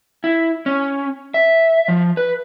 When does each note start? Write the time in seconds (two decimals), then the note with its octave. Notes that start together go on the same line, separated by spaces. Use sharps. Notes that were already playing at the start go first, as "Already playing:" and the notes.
0.24 E4
0.66 C#4
1.34 E5
1.88 F3
2.17 B4